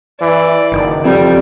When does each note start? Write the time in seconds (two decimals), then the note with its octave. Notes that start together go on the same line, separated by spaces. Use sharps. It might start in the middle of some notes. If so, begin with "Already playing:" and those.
0.22 E3 D5
0.72 F#1 D#3
1.05 F2 G3